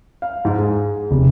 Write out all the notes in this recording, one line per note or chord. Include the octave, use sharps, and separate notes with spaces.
F5
G#2
G#4
F1